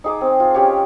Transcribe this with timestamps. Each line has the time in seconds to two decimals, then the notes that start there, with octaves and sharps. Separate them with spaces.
0.04 D#4 G#4 D6
0.21 C4
0.40 F4
0.54 C#4 G4 C#5